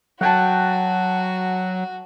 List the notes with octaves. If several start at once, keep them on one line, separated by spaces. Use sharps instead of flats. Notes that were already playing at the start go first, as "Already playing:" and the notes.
F#3 F#4 F#5 G5 A5